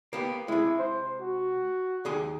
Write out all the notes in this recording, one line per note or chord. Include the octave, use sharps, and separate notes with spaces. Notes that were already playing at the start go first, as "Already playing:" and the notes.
A#3 B3 G4
C3 G#3 E4
C5
F#4
D#2 G#4 C6